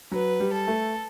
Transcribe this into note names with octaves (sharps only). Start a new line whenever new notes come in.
F#3 B4
G3
A4
A3